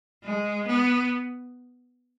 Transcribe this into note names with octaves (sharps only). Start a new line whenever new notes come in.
G#3
B3